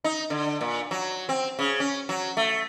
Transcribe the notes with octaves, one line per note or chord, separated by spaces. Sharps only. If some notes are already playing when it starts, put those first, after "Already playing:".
D#4
D3
A#2
F#3
C4
C#3
C#4
F#3
A3